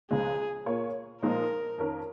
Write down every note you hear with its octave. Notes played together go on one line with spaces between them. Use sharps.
C#2 C#3 F3 G#3 F4 G#4
A#2 A#3 F4 C#5
A#2 F3 G#3 D#4 A#4
F2 D#3 C#4 A#4